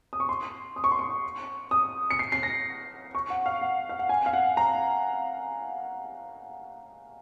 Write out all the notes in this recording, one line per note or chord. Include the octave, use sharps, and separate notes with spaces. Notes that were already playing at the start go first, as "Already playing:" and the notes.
D#6
C#6
C6
D#6
C#6
C6
C#6
D#6
C#7
C7
C7
A#6
C#6
F#5
F5
F#5
F5
F#5
G#5
F5
F#5
A#5